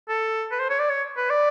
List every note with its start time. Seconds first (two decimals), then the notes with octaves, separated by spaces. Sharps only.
0.09 A4
0.52 B4
0.60 C5
0.70 C#5
0.79 D5
0.90 C#5
1.17 B4
1.30 D5